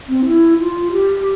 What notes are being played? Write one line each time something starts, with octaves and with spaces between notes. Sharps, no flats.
C4
E4
F4
G4